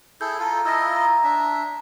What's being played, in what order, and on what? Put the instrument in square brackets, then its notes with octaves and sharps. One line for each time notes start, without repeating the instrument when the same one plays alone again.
[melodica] E4 G#4 A4 [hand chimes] G6
[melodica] F4 A4 [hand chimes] A5 A#5
[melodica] E4 F4 D#5 [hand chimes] E6 A#6
[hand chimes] A#5
[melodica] D4 E5